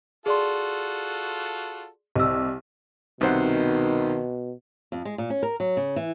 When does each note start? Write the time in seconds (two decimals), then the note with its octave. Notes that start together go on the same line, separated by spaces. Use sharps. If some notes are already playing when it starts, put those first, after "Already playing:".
0.26 F4 F#4 G#4 A4 D5 C6
2.16 C2 D#5 E6
3.21 C2 B2 D#3 C5 F#5
4.92 F2
5.05 G#3
5.18 A#2
5.30 C#4
5.43 A#4
5.60 F#3
5.77 C#3
5.96 E3